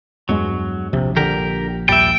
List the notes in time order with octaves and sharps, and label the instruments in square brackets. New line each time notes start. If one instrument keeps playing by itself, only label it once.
[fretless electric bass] E2 G2 G#3 [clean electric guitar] F#3
[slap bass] A#1 [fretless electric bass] C3
[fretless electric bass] D3 [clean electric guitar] G4 A#4
[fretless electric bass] D#2 A#2 [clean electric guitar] G3 E5 [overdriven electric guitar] G5